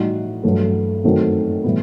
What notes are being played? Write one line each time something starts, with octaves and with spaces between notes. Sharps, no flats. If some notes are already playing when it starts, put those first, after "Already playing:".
Already playing: A2 G3 D#4 F#4
G2 F#3 A3
F#2 D#3 F#3 A3 C4
A2 E3 G3 B3